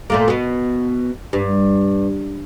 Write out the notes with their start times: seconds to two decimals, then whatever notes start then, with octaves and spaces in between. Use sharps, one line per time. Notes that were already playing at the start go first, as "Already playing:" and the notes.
0.10 A#2 A3 A#3
0.28 B2 B3
1.33 G2